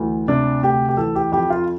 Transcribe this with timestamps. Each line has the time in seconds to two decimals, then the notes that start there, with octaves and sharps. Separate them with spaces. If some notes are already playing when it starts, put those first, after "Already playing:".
Already playing: D2 E3
0.28 C3 D4
0.63 D2 G4
0.89 G4
0.97 E3 A4
1.15 G4
1.32 F2 G4
1.50 F4